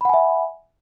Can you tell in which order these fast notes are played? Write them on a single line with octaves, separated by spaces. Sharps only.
B5 F#5 G#5 E5